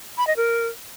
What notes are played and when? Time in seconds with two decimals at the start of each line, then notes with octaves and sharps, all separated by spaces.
0.18 B5
0.27 D#5
0.37 A#4